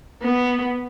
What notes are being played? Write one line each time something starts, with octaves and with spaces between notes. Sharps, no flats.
B3